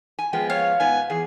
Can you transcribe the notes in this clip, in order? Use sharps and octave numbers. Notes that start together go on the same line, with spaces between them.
G#5
F3 G#3 B3 G5
C#5 F5
G#2 B3 G#5
E2 G#4